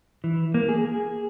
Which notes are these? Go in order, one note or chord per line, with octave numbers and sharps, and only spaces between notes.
E3
A#3
G#4
G#4